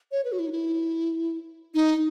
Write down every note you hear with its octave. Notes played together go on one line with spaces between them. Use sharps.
C#5
B4
F#4
E4
D#4
E4
D#4